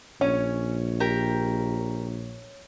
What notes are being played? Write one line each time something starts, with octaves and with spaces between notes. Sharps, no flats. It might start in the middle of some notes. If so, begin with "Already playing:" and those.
A#1 C#4 C#5
G4 A#4